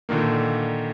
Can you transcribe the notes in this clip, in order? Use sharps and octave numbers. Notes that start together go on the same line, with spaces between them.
A#2 D3 D#3 A#3